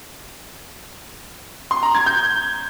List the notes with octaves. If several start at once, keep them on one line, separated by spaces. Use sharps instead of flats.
C6
A#5
G#6
G6